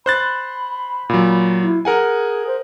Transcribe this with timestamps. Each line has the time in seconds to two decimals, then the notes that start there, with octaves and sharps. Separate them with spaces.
0.06 C5 B5 F#6 A6
1.09 A#2 F#3
1.62 E4
1.85 G#4 A#4 F#5 G#5
2.47 C5